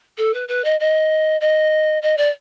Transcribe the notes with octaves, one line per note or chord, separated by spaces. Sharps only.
A4
B4
B4
D#5
D#5
D#5
D#5
D5